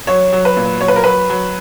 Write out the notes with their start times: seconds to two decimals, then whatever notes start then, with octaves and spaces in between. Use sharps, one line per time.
0.07 F#3 C#5
0.33 F#3
0.45 B4
0.57 A#2
0.81 F#3 C#5
0.88 B4
0.96 A#4
1.04 F#3 B4
1.30 F#3